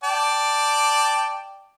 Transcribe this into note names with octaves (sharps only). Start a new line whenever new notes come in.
D5 G5 A5